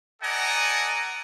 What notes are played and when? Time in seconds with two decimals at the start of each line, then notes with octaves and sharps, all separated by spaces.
0.22 A4 D5 D#5 F#5 G#5 A#5